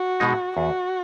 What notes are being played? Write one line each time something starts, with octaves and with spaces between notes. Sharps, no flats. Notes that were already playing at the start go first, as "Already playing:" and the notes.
Already playing: F#4
B2 G#3 D#4
E2 F#4